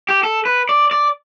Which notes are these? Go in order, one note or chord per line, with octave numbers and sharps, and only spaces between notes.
G4
A4
B4
D5
D5